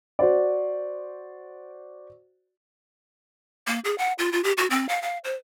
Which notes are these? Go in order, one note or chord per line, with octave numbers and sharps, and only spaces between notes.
F#4 C5 D5
A#3
G#4
F#5
F4
F4
G4
F#4
C4
F5
F5
C5